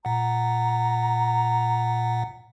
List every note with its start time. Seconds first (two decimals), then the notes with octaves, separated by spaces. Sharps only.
0.05 A#2 F#5 A#5